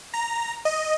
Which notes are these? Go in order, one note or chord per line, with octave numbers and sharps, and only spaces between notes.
A#5
D#5